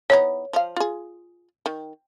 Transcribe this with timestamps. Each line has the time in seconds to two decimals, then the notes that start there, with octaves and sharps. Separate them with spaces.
0.10 E3 B3 D#4 C#5
0.53 F3 F5
0.76 F4 G#4
1.66 D#3